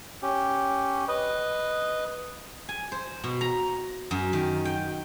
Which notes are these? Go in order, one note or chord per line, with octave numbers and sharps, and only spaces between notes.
C#4 G4
B4 D#5
G#5
C5
B2
A#5
F#2
D#3
G5